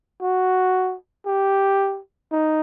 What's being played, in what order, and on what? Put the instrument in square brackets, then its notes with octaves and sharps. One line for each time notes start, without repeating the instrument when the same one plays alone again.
[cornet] F#4
G4
D#4